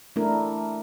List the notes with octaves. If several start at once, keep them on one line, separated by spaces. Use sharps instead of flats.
A3 D4 E4 A#4